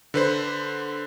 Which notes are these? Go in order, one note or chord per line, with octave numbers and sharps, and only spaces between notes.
D3 B4 C5